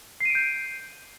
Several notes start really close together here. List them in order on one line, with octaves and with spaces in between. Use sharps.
C7 D#7 D7 G6